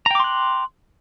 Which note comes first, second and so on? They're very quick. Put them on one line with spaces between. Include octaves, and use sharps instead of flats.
A#5 G5 D6 C6 F#6